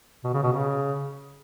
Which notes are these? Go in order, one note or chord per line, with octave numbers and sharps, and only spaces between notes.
B2
C#3
B2
C#3